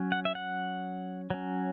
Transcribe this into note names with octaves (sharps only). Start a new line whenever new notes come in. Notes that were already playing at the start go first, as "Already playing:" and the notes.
Already playing: F#3 C#4
F#5
E5
F#5
F#3 C#4